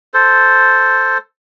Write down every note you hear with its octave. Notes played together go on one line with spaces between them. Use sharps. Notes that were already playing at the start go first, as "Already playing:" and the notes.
A4 C5